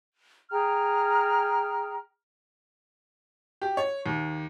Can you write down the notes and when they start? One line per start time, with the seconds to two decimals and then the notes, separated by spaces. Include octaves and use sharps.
0.52 G#4 G5 A#5 F6
3.62 G4
3.77 C#5
4.06 D#2